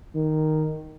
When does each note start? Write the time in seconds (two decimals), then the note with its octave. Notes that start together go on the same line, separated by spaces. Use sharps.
0.15 D#3